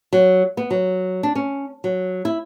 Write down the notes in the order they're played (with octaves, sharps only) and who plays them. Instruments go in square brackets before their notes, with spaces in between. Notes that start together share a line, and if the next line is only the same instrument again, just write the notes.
[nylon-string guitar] F#3
B3
F#3
D4
C#4
F#3
E4